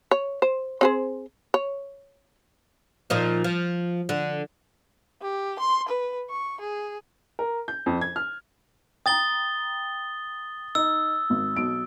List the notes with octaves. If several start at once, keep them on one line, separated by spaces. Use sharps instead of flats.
C#5
C5
C4 G#4 C5
C#5
A#2 F3 D#4
F3
D3
G4
C6
B4
C#6
G#4
A#4
G6
F2
G#6
F6
G5 A#5 D#6 A6 G7
D#4 E6
G#1
B1 D7